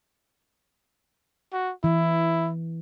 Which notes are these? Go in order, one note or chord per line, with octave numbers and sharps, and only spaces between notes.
F#4
E3 E4